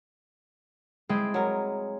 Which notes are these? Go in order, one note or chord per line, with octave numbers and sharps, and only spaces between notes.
G#3 C4 E4 G5
F#3 A#4